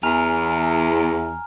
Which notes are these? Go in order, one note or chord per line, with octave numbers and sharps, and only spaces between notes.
E2 G#5 A#5 F6